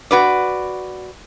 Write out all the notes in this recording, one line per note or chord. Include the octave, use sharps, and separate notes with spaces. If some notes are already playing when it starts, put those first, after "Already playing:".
F#4 B4 D5